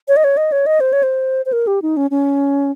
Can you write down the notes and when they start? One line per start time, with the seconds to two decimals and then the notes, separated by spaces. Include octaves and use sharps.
0.08 C#5
0.17 D#5
0.24 C#5
0.37 D#5
0.52 C#5
0.66 D#5
0.80 C5
0.93 C#5
1.03 C5
1.46 C5
1.53 A#4
1.67 G4
1.82 D#4
1.97 C#4
2.11 C#4